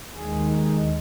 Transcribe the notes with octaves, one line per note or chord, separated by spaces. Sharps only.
D#2 D#3 G#3 G#4
D#4